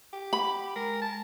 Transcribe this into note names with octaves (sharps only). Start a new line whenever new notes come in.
G4
F#5 B5
G#3 A#4
A5